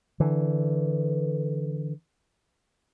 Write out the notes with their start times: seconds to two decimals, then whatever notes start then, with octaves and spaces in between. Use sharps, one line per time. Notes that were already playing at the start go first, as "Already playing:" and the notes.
0.20 D3 E3